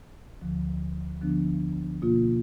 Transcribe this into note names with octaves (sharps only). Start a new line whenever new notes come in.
D2 D3 F3
D3 F3 B3 D4
B2 A#3 F4